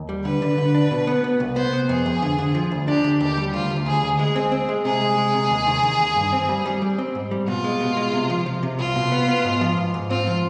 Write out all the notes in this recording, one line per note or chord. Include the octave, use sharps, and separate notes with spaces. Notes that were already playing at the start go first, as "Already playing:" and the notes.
Already playing: D#2
G3
D3 B4
D3
D3
D4
B2
B3
B3
C2
B3 C5
B3
F2 G#4
F2
D3
D3
F3
D2
D4 G4
D3
D#2 G4
G3
D2 F4
D2
D2 G#4
D2
G#3 G#4
C4
C4
G#3
C3 G#4
G#3
G#3
C3
D#2
D#3
D#3
D#2
G2
C4
G3
G3
G3
C4
G#2
G3
B2 F4
G#3
B2
G#3
C3
F3
F3
C3
C2 F4
B2
B3
B3
G#2
F3
G#2
G#2
C4 F4
F3